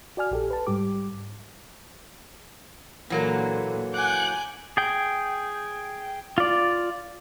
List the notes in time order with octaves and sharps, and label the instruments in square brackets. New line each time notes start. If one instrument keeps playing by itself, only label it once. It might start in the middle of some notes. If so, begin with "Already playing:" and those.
[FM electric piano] F#4 D5 G#5 F6
A#1 G4 A4
B4 A5
G#2 G3 G4 D6
[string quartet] A#2 D3 [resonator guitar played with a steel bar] E3 F#3 A#3
[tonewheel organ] F#5 F#6 [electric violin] G#5 D6 [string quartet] G6
[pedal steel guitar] G#4 G5
F4 D5